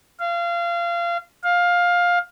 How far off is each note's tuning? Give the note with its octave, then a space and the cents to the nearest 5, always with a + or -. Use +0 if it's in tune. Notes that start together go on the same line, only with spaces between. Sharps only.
F5 -25
F5 +15